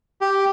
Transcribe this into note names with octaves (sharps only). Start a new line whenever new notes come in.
G4